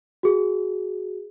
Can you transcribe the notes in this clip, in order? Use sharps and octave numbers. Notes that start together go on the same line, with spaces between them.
F#4 G#4